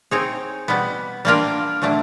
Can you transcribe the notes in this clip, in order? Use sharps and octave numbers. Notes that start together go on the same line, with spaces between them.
C4 D#4 G#4 C#5
B2 G3 B3
G3 A#3 D4 F4 A#4
A#2 F#3 A3 D4